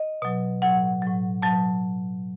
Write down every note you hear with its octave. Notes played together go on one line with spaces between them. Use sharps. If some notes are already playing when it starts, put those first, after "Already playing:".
Already playing: D#5
B2 F#3
A2 F#3 F#5
A2 F#3
B2 F#3 A5